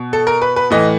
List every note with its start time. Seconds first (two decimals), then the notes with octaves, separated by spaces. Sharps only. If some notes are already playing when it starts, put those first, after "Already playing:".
Already playing: B2
0.13 A4
0.27 A#4
0.42 B4
0.56 B4
0.71 A2 E3 D#5